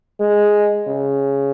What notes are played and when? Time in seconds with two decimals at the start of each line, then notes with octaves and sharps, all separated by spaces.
0.20 G#3
0.88 C#3